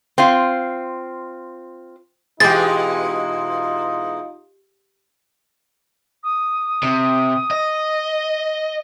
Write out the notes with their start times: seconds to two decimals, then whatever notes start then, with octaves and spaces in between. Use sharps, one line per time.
0.18 C4 F4
2.40 B2 E3 G#3 D#4 F4 G4 G#4 A6
6.23 D#6
6.83 C3
7.51 D#5